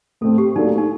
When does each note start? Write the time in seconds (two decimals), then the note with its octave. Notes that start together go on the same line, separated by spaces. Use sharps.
0.21 A2 A3 C4 A4
0.38 G4
0.56 F#3 A#3 D4 D#4 A4
0.78 D#4